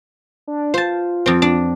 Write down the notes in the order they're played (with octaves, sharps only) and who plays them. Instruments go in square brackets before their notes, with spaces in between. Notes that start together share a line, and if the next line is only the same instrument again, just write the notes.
[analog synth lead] D4
[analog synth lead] F4 [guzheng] C5 A5
[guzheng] F2 C4
D4